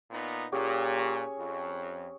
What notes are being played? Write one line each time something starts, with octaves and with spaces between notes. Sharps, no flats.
A#2 B3 D#4
A#2 C#4 G4 G#4
C#5 G#5
F2